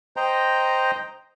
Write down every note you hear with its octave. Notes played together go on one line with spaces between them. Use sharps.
C5 D#5 G5 A#5